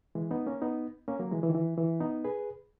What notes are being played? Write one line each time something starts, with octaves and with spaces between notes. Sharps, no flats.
E3 G#3
B3 D#4
A#3 C#4
B3 D#4
A#3 C#4
F#3 A#3
E3 G#3
E3
D#3
E3
E3
B3 D#4
G#4 B4